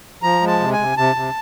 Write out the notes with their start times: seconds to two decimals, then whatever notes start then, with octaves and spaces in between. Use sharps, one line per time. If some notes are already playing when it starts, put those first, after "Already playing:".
0.23 F3 A#5
0.41 G#3
0.47 A5
0.60 C3
0.72 G#5
0.78 C3
0.97 C3 A5
1.16 C3